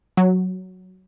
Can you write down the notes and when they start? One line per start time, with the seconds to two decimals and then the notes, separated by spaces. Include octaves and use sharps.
0.17 F#3